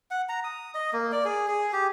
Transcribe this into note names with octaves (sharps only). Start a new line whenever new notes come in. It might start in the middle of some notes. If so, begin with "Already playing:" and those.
F#5
A#5
D#6
D#5
A#3
D5
G#4
G#4
G4